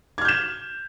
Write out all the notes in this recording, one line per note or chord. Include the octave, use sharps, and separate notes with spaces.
F6 G6 G#6 E7